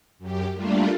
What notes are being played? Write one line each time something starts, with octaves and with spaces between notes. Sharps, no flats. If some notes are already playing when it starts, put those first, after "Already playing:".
F#2 G4
G3 A3 A#3 D4 F4